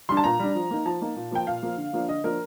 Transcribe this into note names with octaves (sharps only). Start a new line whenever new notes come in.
G3 D4 C6
A5
A#2 A#5
G3 D4
F3
A#3 D#4
F3 A5
A#3 D#4
A#2
F3 A#3 G5
A#2 F5
F3 A#3
D3
F3 A#3 D4
D3 D#5
F3 A#3 D4 A#4